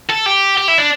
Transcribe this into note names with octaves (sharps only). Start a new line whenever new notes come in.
A4
G4
G4
E4
D4